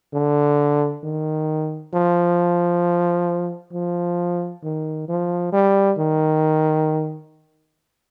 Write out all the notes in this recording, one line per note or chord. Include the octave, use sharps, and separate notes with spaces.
D3
D#3
F3
F3
D#3
F3
G3
D#3